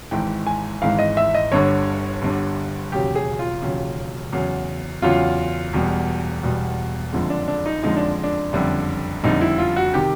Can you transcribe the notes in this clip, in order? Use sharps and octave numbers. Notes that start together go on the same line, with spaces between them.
G#1 G#2 E3 G#3 G5
G#5
G#1 G#2 E3 G#3 F5
D#5
E5
D#5
G1 G2 D3 C#5
G1 G2 D3
E1 D#2 C#3 F#3 G4
G#4
F4
E1 D#2 C#3 F#3
E2 C#3 F#3
E2 C#3 F#3 F4
E1 E2 B2 G3
E1 E2 B2 G3
F#1 F2 D3 F3 G#3
D4
D4
D#4
F#1 F2 D3 F3 G#3 D#4
D4
D4
F#1 F2 D3 G3
F#1 F2 D3 G3 D#4
E4
F4
F#4
C3 D#3 G4